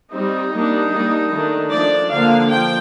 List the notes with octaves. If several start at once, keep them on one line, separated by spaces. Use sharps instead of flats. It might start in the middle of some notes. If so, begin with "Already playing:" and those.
G3 C4 D#4
G3 A#3 D4
G3 A#3 D4
D#3 A3 D4
F3 A3 D4 D5
D3 F3 A#3 D4 F5
F3 G5